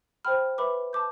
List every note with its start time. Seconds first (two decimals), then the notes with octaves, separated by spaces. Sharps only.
0.25 C5 G5 B5 F6
0.58 B4 E5 B5 D6
0.93 A5 D6 G6